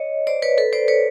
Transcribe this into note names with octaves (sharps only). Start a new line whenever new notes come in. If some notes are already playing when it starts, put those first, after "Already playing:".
Already playing: C#5 D#5
C5 D5
B4 C#5
A4 B4
C5 D5
B4 C#5